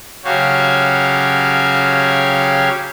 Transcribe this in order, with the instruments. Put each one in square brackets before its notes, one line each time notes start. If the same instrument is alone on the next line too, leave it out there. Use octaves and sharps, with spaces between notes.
[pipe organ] C#3 F#3 F#4 G4 C#5 F5